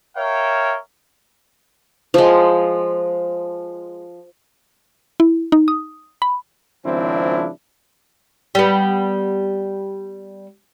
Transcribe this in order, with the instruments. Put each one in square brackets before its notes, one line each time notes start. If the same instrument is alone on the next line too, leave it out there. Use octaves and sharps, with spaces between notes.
[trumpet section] A#4 C#5 E5 F5 G5
[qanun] F3 G#3
[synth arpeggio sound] E4
D#4
D#6
B5
[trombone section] G#1 C#3 F3 C4 D4 E4
[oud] G3 B3